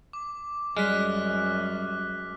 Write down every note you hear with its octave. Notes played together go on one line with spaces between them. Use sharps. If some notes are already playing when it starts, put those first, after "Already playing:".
D6
F#2 G3 G#3 F6 F#6 B6